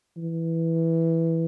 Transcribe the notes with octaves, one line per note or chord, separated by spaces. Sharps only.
E3